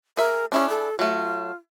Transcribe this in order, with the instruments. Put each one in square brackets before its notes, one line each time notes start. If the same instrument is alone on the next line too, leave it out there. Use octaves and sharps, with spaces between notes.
[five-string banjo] G#4 E5 [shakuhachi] A#4
[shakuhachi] C#4 [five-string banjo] D4 E4 G#4
[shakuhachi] A4
[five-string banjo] F#3 A3 [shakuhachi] F4